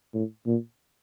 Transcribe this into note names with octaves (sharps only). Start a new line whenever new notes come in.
A2
A#2